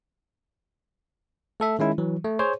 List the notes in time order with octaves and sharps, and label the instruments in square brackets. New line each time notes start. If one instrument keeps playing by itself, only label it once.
[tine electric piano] A3 A4 E5
D#3 G#3 C#4 E4
E3 F#3
A3
G#4 C5 C#5